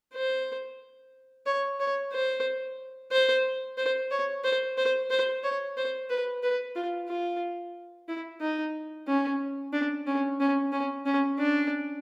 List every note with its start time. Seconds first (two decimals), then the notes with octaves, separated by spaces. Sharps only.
0.14 C5
1.46 C#5
1.80 C#5
2.12 C5
3.12 C5
3.78 C5
4.11 C#5
4.44 C5
4.78 C5
5.11 C5
5.44 C#5
5.77 C5
6.10 B4
6.43 B4
6.75 F4
7.09 F4
8.08 E4
8.41 D#4
9.08 C#4
9.73 D4
10.07 C#4
10.40 C#4
10.72 C#4
11.06 C#4
11.39 D4